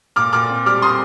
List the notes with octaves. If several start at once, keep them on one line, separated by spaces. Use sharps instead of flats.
A#2 D6 F6
A#2 D6 F6
C4
G3 D6 F6
C4 C6 D#6